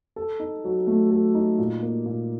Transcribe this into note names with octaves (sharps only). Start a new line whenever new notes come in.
A4
D#4
F#3
A3
A4
D#4
A#2
A#3
A#2